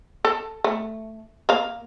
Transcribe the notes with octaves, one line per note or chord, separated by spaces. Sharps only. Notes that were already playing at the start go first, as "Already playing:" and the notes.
A4
A3
A#3 F5